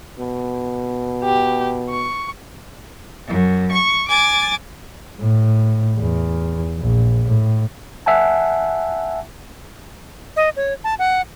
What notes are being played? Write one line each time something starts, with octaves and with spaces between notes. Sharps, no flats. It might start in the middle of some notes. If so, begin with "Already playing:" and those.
B2
G4
C#6
F#2
C#6
G#5 D6 A6
A2
E2
A#1
A2
E5 F#5 G#5 A5
D#5
C#5
A5
F#5